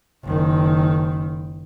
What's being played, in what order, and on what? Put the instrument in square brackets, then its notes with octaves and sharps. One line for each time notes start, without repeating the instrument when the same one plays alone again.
[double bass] F#1 D#3